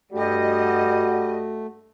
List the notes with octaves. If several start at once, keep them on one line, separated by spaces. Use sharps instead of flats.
G2 G3 A3 F#4 D#5